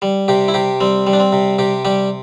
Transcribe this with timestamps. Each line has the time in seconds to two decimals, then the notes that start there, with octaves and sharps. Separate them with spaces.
0.02 G3
0.28 C3 G4
0.48 E4
0.54 C3 G4
0.81 G3 C4
1.07 G3
1.13 D4
1.20 C4
1.32 C3
1.58 C3 G4
1.85 G3 G4